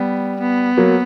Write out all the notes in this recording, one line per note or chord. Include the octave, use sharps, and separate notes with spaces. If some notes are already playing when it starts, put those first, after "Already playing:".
Already playing: G3 B3
B3
F#3 A#3